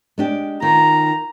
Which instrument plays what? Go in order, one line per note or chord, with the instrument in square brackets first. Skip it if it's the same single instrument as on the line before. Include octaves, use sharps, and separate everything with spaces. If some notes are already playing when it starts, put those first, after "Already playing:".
[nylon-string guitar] G#3 D4 G4
[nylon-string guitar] D#3 F4 [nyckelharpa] A#5